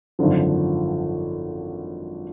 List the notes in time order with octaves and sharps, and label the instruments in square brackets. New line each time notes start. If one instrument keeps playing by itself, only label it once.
[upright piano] G#1 F#2 D3 F3